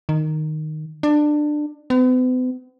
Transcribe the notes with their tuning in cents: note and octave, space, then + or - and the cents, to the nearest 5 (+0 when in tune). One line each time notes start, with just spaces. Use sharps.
D#3 -10
D4 +20
B3 +45